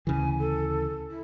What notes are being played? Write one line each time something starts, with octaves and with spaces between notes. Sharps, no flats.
D2 C#3 E3 G#5
A4
E4